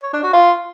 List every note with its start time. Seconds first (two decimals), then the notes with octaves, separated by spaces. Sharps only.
0.03 C#5
0.13 D4
0.23 F#4
0.33 F4